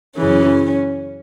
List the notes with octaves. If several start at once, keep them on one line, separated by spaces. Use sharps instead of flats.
F#2 C#3 E3 C#4